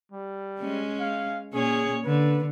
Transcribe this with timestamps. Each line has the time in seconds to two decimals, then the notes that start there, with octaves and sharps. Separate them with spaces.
0.12 G3
0.60 G#3 C#4
1.00 F5
1.54 A#2 C#4 G#4 C#5
2.05 D3 B4